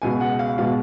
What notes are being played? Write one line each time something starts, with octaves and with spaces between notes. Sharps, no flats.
C#2 B2 G#3 G#5
F#5
F5
B2 G#3 F5